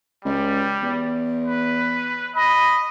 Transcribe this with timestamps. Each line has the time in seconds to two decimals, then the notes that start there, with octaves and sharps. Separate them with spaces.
0.25 C#2 G3
0.82 E2
1.45 B4
2.36 D#5 B5